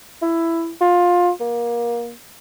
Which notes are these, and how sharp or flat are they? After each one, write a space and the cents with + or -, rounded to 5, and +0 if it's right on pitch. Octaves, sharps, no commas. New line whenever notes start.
E4 +10
F4 +20
A#3 +25